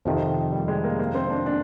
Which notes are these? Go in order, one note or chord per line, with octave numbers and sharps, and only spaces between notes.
F2 C3 D#3 F3
G3
G#3
A#3
A#3
C4
D4
D4